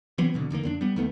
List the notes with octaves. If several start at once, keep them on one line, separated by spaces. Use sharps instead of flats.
E3 F#3 B3 C4
E1 B2 D3
E2 D3 D#3 A#3
F2 C4 D4
G3 B3
D#2 D#3 A3 B3